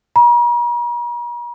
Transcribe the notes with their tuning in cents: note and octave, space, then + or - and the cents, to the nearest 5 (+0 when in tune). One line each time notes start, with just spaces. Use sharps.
A#5 +45